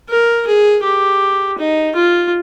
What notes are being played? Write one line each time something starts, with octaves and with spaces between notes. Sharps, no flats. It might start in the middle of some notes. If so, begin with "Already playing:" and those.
A#4
G#4
G4
D#4
F4